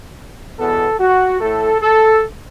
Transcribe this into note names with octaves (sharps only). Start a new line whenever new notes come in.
E2 B2 B3 A4
F#4
A2 A3 A4
A4